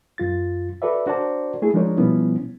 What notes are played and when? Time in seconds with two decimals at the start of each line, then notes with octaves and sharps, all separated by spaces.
0.18 F#2 F4 A6
0.82 F#4 A4 B4 D5 E5
1.06 D4 F#4 A#4 C5 D5 A5
1.62 A3 E4 G#4
1.74 F3 G#3 D4 D#4 A#4 C#5
1.97 B2 F3 G3 B3 C#4 E4